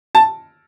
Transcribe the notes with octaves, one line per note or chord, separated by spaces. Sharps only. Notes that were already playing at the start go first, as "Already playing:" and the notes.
A5